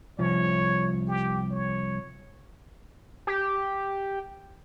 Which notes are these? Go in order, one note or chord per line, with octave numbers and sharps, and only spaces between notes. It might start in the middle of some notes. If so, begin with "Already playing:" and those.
C2 F3 C#5
G4
C#5
G4